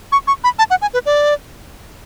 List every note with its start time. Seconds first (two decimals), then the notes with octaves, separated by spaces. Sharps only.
0.12 C#6
0.27 C#6
0.44 B5
0.59 A5
0.70 F#5
0.82 G#5
0.94 B4
1.06 D5